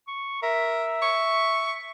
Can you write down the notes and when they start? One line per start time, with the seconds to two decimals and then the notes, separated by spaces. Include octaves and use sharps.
0.07 C#6
0.43 A#4 E5
1.02 C#6